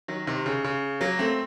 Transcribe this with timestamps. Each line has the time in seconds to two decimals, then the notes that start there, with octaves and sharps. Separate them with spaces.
0.08 D#3 F#3
0.27 C3 D#3
0.46 C#3
0.64 C#3
1.01 F#3 A#3
1.19 A3 C4